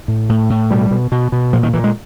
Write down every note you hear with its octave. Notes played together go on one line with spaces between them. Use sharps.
A2
A2
A2
B2 G3
B2
B2
B2
A#2 F3
D#3
A#2 E3
G#3